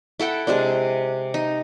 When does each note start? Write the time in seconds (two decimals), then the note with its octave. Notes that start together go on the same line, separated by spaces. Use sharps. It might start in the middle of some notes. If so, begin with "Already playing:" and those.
0.20 E4 A4 F#5 G5
0.47 C3 G#3 C4 D4
1.34 D#4